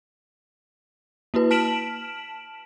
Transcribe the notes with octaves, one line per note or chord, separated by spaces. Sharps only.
A#3 E4 F#4 B4
A5 F6 B6 D7 E7 F#7